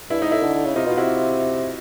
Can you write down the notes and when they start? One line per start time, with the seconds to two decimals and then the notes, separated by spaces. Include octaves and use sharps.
0.10 G2 E4
0.22 G#2 D#4
0.32 A2 E4
0.43 D3
0.54 D3
0.65 C#3
0.76 C3 D#4 F4
0.86 B2 F4
0.97 C3 E4 F#4